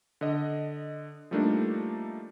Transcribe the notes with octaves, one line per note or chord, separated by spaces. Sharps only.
D3 D#5
F3 G3 A3 A#3 D4 D#4